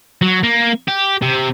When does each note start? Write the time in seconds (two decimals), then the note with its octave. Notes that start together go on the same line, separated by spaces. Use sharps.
0.22 F#3
0.43 A#3
0.88 G4
1.22 C3